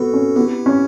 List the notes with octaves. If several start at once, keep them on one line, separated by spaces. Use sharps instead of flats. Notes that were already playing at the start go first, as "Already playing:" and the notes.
Already playing: B3 F#4 A4
C#4
B3 E4 G4
C#4